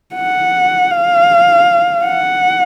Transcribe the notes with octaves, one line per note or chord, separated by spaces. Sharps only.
F#5
F5
F#5